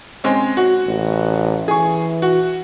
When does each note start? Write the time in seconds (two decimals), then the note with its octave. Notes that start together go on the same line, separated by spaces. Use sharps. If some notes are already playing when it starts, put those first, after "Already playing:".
0.24 G#3 C4 C#4
0.57 F#4
0.87 A1
1.68 E3 G#4 C#6
2.22 F#4